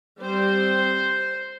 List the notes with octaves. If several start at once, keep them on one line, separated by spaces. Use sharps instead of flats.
G3 C4 C5